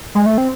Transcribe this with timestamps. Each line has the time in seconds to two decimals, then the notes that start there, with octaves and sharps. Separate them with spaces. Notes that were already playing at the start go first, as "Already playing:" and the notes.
0.15 G#3
0.26 A3
0.38 C4